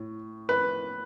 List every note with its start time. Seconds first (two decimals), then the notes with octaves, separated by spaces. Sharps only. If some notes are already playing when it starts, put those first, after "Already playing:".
Already playing: A2
0.49 B4